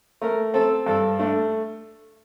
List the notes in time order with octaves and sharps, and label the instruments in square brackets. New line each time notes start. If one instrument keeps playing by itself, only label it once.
[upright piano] A3 [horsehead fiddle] A#4
[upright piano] C4 [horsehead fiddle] A4
[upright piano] G2 [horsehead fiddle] A4
[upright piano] A3 [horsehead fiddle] D4